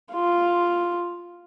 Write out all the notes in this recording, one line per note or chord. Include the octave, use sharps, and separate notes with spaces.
F4